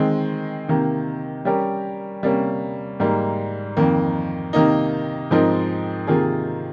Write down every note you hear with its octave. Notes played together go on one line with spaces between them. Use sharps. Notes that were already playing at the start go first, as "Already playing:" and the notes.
Already playing: D#3 G#3 C4
C3 D#3 A#3
G3 C#4 G4 A#4
C3 G3 A#3 C#4
G#2 G3 A#3
F2 D#3 A#3
C3 D#3 A#3 D#4
G#2 F3 C4 D#4 A#4
C3 D#3 A#3 F4 G#4